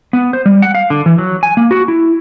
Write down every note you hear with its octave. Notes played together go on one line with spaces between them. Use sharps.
B3
C5
G3
F#5
F5
D3
E3
F#3
G#5
A#3
F#4
E4